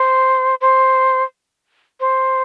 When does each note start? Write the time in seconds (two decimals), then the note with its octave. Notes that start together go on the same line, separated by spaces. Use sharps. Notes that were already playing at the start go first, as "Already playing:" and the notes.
Already playing: C5
0.61 C5
2.00 C5